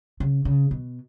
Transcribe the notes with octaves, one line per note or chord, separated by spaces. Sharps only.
C#3
C#3
B2